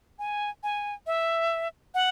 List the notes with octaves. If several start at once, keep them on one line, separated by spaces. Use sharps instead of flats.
G#5
G#5
E5
F#5